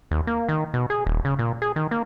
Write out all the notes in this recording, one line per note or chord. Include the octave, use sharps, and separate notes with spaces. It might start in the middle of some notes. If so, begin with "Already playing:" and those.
D#2
A#3
D#3
B2
G#4
D#1
C#3
A#2
G#4
D#3
A#3